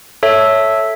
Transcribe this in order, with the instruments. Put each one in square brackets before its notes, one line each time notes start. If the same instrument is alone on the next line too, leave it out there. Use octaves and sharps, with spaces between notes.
[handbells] A4 C#5 E5